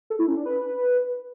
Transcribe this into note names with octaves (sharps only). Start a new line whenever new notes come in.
A4
E4
C#4
D4
B4